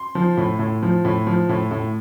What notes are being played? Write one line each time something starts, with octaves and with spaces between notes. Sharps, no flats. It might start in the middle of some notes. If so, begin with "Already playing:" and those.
Already playing: C6
F3
A2
A2
F3
A2
F3
A2
A2